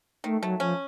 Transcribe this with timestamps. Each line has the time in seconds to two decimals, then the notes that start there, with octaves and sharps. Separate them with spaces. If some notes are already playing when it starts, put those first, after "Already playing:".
0.24 D#3 A3
0.42 F#3 A3
0.60 F3 C#4